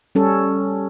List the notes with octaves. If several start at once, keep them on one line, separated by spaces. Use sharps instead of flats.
G3 C#4 A4